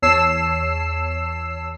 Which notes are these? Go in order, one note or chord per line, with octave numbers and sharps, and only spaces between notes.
E2 C#5 A5 E6 C7 E7